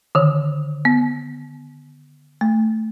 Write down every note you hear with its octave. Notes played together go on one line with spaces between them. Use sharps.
D3 D#3
B3
A3